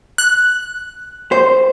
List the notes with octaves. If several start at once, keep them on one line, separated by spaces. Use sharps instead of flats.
F#6
C5